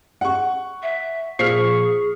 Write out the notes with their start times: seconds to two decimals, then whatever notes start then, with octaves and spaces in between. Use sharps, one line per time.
0.21 F#5 C#6
0.83 E5
1.39 A#2 F3 G#4 C#6 F6 B6 C7